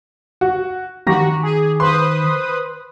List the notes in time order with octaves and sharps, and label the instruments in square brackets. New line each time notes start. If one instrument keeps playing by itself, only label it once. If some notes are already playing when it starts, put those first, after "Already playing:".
[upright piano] F#4
[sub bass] D#3 [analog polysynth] F#4 [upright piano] G4 A#5 A#6
[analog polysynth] G#4
[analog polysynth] B4 C5 D#6 [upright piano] C6